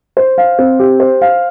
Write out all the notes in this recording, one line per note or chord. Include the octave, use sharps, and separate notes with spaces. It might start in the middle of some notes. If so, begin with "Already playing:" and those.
C5
F5
C4
G4
C5
F5